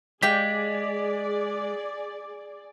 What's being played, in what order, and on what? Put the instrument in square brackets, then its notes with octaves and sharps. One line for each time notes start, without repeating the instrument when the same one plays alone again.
[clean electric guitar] G#3 [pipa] G4 F5 G5 [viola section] G#4 D5 [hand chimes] B6